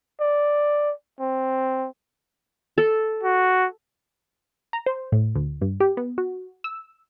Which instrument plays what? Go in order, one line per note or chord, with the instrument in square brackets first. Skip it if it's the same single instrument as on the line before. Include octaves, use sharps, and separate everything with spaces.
[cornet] D5
C4
[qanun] A4
[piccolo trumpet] F#4
[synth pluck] A#5
C5
A2
D2
G2
G4
B3
F#4
E6